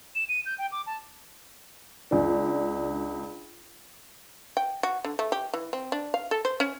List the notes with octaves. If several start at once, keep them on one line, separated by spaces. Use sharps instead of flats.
E7
D#7
G6
G5
D6
A5
C#2 D4
G5
F#4
D3
A3
G4
E3
C4
D4
F5
A4
C5
C#4